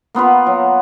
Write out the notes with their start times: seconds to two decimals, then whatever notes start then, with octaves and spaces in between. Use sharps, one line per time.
0.15 A#3 B3 F4 B4
0.47 F#3